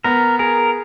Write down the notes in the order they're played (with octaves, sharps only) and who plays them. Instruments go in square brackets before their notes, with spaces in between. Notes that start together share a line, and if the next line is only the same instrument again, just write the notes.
[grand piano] B3 [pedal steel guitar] A#4
[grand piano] G#4 [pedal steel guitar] A#4